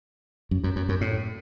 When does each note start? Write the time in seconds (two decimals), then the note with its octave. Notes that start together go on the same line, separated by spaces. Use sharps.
0.51 F#2
0.64 F#2
0.76 F#2
0.89 F#2
1.01 A2